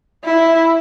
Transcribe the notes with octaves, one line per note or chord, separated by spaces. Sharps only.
E4